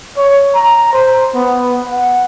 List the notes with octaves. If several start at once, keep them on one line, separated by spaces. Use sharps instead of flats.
C#5
A#5
C5
B3
F#5